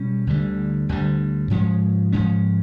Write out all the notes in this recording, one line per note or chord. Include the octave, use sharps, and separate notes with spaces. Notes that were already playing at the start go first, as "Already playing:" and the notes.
Already playing: B2 G3 C#4
D2 D3 G3
D2 D3 G3
G#2 F3 G#3 C#4
G#2 F3 G#3 C#4